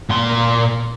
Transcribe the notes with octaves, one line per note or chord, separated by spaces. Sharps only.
A#2 C6